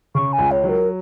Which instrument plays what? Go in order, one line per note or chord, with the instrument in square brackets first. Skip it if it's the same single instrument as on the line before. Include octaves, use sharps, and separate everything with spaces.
[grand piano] C#3 [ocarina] C#6
[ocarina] G#5
[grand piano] C#2
[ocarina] C#5
[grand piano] F#3
[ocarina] A#4